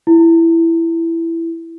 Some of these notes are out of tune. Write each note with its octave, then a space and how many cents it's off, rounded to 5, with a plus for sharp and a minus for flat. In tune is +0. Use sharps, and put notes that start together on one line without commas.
E4 +10